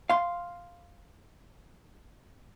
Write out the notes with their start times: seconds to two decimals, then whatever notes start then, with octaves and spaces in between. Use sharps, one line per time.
0.10 F5 C6